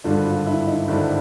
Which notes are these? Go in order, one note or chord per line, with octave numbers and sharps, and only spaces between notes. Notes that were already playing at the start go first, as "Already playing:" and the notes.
G#1 G2 D3 G3 F4
F4
E4
D#4
G#1 G2 D3 G3 E4